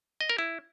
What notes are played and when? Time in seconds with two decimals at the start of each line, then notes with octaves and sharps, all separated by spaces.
0.21 D#5
0.30 A#4
0.38 E4